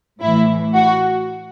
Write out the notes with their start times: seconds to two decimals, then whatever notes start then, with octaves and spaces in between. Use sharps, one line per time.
0.20 A2 E3 E4
0.73 F#4